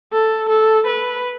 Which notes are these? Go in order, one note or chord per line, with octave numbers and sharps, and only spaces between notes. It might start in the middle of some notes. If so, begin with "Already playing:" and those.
A4
A4
B4